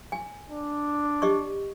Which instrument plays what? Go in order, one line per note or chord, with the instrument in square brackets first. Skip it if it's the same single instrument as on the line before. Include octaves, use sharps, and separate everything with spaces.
[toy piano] G#5
[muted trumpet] D4
[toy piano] G4 D#5 C#6